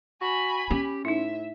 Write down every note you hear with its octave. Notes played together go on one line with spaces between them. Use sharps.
F#4 G#5 B5
C#4 G4
A2 D#4 E4 E5